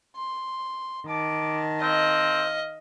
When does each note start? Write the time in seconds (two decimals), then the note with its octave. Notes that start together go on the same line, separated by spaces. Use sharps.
0.15 C6
1.07 D#3 A5 D6
1.82 C4 D#5 F5